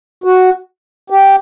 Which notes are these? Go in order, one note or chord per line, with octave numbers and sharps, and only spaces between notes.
F#4
G4